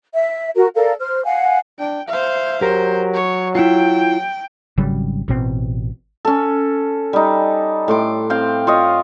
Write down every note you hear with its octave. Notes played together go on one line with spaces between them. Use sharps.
E5
F#4 A#4
A4 A#4 D5 F5
C5 F6
F5 F#5 G#5
D4 G5
C5 E5 F5
F#3 G4 A#4 C5
C#5
E4 F4 G5
G#1 C#3 F#3 G3
A1 B2 C4
C#4 A4
G3 D#4
A2 C6 D6
C4 F5 G5
F4 C#5 D#5